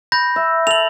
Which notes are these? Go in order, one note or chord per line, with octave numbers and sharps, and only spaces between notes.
B5 G6 A#6
E5
A4 F7 F#7